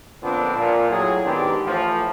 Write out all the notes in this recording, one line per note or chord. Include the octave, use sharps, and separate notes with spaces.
F2 A#2 D3 B3 C4 D4
A#2
A2 F#3 G#4
G#2 D#3 B3 C4 D4 G4
A2 E3 F3